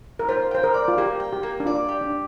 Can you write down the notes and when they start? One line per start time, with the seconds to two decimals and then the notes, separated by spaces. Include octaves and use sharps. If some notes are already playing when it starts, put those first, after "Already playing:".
0.19 A#4
0.29 F4 C5
0.51 C5 G5
0.64 A#4
0.74 D5
0.88 F4
0.98 A#3 G4
1.20 G5
1.32 G4
1.43 A#3
1.60 D4
1.66 F4 D5
1.89 G4
2.01 D4